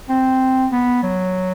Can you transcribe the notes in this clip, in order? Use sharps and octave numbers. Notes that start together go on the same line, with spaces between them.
C4
B3
F#3